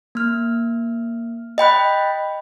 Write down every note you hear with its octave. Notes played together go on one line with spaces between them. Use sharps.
A#3 F6
D#5 G5 B5 F#6